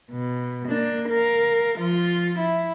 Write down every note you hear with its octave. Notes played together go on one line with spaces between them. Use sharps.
B2
A#3 D4
A#4 F5
F3 F4
E4